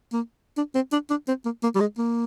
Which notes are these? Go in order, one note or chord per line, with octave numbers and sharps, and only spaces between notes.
A#3
D4
C4
D4
D4
C4
A#3
A#3
G3
G#3
A#3